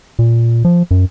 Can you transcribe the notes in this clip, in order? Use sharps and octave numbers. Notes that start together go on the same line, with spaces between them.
A#2
F3
F#2